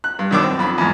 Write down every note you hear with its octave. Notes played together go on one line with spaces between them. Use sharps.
F#6
G2
F#2 B2 D#3 D4 D6 E6
C4
F2 B5
E2 G#2